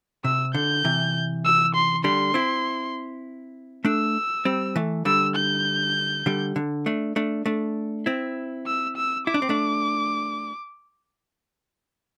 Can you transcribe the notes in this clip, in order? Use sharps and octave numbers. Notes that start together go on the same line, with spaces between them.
C3 E6
D3 G6
C3 E3
E6
C6
D3 G3 C6
C4 E4
A3 D4 E6
G3 C4
E3 A3
D3 G3 E6
G6
D3 G3
D3
A3 D4
A3 D4
A3 D4
C4 E4
E6
E6
E4 D6
D4
C4
A3 D4